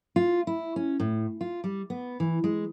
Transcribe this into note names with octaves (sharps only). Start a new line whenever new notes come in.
F4
E4
C#4
A2
F4
G3
B3
E3
G#3